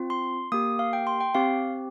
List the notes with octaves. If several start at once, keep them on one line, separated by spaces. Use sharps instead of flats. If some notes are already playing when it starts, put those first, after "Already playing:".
Already playing: C4 F4
C6
A#3 G4 D#6
F5
G5
C6
G5
C4 G4 F5